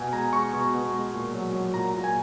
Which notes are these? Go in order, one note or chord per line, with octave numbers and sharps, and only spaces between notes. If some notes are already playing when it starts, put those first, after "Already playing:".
Already playing: B2 G#5
G#3 A#5
G#3 C#6
B2
B2
G#3
A#2
F#3
F#3
A#2 A#5
A#2
G#5